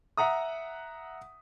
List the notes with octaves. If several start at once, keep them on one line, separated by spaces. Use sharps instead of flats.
E5 F#5 A#5 D#6